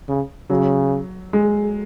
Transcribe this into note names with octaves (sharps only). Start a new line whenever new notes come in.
C#3
C#3 F#3
G#3